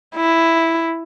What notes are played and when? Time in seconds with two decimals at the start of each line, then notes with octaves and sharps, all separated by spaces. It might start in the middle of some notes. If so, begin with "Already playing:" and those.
0.16 E4